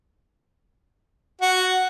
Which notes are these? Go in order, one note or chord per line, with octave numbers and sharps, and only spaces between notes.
F#4